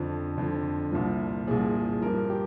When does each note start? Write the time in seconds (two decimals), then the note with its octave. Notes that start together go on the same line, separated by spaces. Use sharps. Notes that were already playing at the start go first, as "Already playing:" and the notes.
Already playing: F2 D3 F3
0.38 F2 D3 F3
0.92 C2 A#2 F3
1.47 C2 A#2 F3 G#4
1.75 G#4
2.02 F3 A#4
2.06 G2
2.30 G4